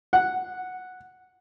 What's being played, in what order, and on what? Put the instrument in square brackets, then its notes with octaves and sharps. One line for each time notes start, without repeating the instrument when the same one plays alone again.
[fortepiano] F#5